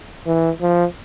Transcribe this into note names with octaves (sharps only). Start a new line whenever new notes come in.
E3
F3